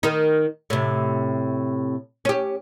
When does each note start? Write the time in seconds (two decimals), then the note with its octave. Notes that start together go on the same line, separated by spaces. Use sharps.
0.03 D#3 D#4
0.70 A2 C3
2.25 C#4 G4